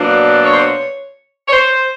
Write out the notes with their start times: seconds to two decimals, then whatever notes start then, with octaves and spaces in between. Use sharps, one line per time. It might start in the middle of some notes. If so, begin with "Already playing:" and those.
Already playing: B2 F#3 A#3 D4
0.44 C#5
0.52 C5
0.60 C#5
1.47 C#5
1.52 C5